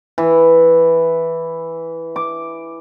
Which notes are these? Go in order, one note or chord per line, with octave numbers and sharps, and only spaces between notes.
E3
D6